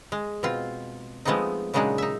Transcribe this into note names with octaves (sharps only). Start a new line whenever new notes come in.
G#3
B2 C4 F4
F3 G#3 A3 B3 C4 D#4
A#2 C#3 F#3 G#3 D4 D#4
D#4 E5